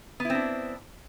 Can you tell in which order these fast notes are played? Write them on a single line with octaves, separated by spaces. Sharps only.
B3 E4 C4 D4